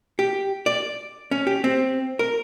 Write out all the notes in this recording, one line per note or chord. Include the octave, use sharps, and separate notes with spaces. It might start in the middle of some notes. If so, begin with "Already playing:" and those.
G4
D5
C#4
G4
C4
A#4